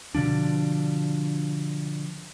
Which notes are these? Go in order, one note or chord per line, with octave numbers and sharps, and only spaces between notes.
B2 D3 F3 D4